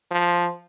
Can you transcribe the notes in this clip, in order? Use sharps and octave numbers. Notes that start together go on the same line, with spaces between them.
F3